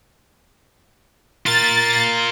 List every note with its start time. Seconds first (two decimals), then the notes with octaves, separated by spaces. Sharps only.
1.46 F4 A#4 A6